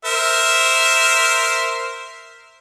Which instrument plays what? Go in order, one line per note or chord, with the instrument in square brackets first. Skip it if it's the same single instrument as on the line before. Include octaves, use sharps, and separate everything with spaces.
[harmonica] A#4 C5 E5